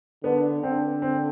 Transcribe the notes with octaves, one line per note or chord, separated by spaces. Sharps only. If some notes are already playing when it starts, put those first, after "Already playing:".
D3 B3
D3 C4
C4